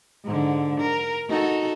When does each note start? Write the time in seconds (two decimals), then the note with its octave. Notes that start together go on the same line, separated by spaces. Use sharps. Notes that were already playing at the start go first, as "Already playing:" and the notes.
0.25 G#2 D3
0.80 A#4
1.29 D#4 F#4 A4